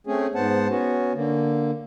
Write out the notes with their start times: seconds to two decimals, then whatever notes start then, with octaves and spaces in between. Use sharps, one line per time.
0.07 A3 C4 C#4 G#4
0.35 G#2 B3 C5 F#5 A5
0.69 B3 C#4 F#4
1.14 D3 A#3